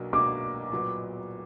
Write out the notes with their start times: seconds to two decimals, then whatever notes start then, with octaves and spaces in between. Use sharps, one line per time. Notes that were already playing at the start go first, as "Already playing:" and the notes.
Already playing: B1 B2 F#3 A#3 D4
0.13 B1 B2 F#3 A#3 D4 D6
0.72 A#2 F#3 B3